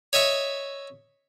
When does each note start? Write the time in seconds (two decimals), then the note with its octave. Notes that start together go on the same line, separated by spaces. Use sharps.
0.13 C#5 D#5 E5 C#6